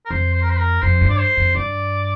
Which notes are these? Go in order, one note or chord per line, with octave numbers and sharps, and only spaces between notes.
A#4
F2 C5
C5
A#4
C5
A#4
F2 C5
G2
D5
C5
F2
G2 D5